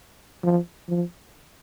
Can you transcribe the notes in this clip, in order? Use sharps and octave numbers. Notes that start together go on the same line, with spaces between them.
F3
F3